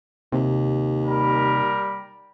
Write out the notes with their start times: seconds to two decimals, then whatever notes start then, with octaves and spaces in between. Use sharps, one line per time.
0.32 D#2 C3
1.06 G3 A#4 B5